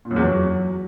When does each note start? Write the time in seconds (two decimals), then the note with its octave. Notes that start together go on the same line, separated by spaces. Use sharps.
0.05 A#2
0.11 F#2
0.16 E2
0.22 F#3